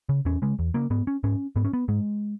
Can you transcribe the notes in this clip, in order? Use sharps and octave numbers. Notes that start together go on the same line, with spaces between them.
C#3
E2 C#4
C#3 G#3
E2
C#3 A#3
G#2 B3
C#4
G#2 C#4
G#2 B3
C#4
B3
G#2 G#3